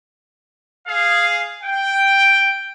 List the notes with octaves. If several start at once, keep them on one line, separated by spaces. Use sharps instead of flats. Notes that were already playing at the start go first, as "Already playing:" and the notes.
G#4 F5
G5